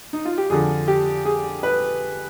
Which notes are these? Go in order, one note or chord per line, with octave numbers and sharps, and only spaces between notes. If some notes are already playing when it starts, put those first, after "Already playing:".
D#4
F4
G4
F2 D3 F3 G#4
G4
G#4
B4